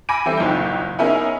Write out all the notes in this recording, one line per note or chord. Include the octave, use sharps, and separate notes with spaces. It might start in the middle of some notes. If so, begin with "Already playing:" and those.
G#5 B5 D6 A#6 D7 D#7
E3 G3 C4 E4 A4
F#1 B1 A#2 D#4 G5
B3 C#4 D#4 E4 G#4 A#4